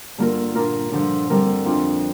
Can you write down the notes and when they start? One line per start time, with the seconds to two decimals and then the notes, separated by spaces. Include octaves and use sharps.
0.18 G2 D3 A#3 F4 A#4
0.54 A#2 A#3 D4 F4 A#4
0.91 G2 D3 F3 D4
1.30 D3 G3 C4 A#4
1.65 F2 F3 D4 F4